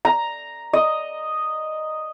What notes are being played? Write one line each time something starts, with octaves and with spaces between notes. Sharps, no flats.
A#5
D#5